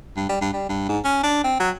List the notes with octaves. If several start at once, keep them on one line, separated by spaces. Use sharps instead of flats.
G2
G3
G2
G3
G2
G#2
C#4
D4
C4
F#3